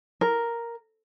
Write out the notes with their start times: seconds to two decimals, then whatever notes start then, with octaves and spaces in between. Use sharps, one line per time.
0.21 A#4